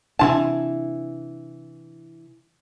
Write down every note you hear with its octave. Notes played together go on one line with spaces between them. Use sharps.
C3 E3 D4 F4 A5